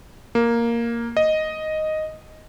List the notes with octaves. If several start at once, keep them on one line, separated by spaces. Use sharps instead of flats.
A#3
D#5